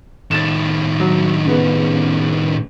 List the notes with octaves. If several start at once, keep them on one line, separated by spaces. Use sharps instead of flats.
A2 D#3 A6 E7
F#3
C#3 B3